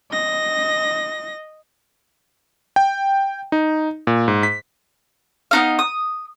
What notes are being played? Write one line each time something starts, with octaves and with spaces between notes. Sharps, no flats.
D#5 A#6
G5
D#4
A#2
G#2
B6
B3 D#4 F5
D#6